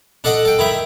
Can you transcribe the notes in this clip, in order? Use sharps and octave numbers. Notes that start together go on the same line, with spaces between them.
D4 A4 D#5 F#5
A4 G5
D#3 E4 E5